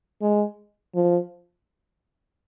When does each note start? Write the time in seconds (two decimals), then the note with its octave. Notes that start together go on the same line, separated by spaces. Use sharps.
0.21 G#3
0.95 F3